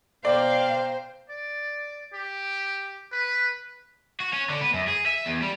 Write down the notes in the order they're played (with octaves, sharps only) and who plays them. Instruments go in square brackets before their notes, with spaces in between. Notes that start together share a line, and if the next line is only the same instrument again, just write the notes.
[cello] B2 F5 [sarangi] C5 [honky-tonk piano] D5 [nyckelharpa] G5 A#5
[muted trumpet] D5
G4
B4
[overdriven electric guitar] F#4
C#4
D3
B3
F#2
G#4
E5
E2
G3